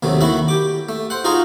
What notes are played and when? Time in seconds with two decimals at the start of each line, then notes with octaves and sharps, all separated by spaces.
0.03 D#2 C3 F#3 A3
0.21 D#3 E4 F#4 E5
0.48 G4 D6
0.89 A3
1.10 C5 F#5
1.24 D#4 F4 F#4 G#4 F5 A#5